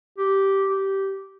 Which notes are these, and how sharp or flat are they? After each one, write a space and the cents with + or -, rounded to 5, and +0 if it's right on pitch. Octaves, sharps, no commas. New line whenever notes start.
G4 -10
G4 -15